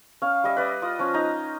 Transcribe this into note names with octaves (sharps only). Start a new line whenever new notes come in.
C#4 F5
G3 D#5 E5
B4 D5 D#5
F4 D#6
F3 C#4
D#4 A#5